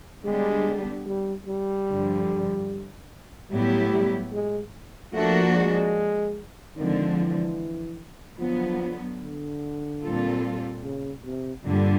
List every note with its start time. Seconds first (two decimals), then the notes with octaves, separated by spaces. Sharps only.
0.24 D3 G3 G#3 B3 D4 G4
1.06 G3
1.46 G3
1.88 G2 D3 F3
3.51 A2 F#3 G3 B3 E4 G4
3.91 G3
4.32 G#3
5.13 F3 A3 A#3 D4 F#4
5.55 G#3
6.76 D3 D#3 F3 G#3 C4
7.17 E3
8.39 D3 F3 F#3 B3
9.21 D3
10.03 A#2 G3 C4 F4 A4
10.83 C#3
11.24 C3
11.65 G2 A#2 D3 G3